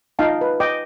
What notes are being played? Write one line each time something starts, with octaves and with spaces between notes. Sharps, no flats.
D#4 F4 D#5 F5 G5 A5
B4
D#5 G5 D6